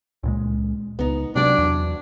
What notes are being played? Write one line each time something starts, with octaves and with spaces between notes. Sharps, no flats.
C#2 A#2 G#3
C#2 B3 D#4
C3 F#3 D4 D5
E2